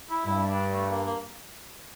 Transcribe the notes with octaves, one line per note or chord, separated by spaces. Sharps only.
E4
G2 E4
D4
A3
A#3
A#3